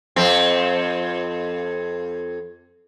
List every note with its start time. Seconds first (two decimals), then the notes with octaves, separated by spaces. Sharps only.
0.16 F2 C4